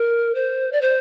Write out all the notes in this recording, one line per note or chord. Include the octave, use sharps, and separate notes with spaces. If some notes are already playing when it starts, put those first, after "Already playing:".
Already playing: A#4
C5
D5
C5